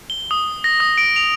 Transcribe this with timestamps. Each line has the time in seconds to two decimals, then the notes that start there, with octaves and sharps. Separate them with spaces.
0.10 G7
0.31 D#6
0.64 A#6
0.80 D#6
0.98 D7
1.16 F7